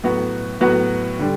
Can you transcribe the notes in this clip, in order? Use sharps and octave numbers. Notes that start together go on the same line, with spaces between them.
A2 F#3 B3 F#4
A2 F#3 B3 F#4
D3 G3